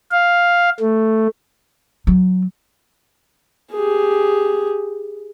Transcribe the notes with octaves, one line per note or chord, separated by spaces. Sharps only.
F5
A3
F#3
G4 G#4